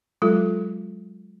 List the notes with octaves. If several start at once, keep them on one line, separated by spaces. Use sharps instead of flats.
F#3 G#3 F4 A4